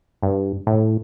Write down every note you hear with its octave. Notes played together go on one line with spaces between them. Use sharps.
G2
A2